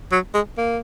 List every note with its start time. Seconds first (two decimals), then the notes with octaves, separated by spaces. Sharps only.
0.12 F#3
0.34 G#3
0.58 A#3